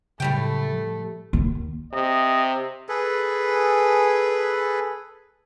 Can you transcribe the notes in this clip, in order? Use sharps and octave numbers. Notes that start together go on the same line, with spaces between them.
A2 C#3 F#3 G3 A3 G5
F3
D#2
C3 D#5
G#4 A4 B4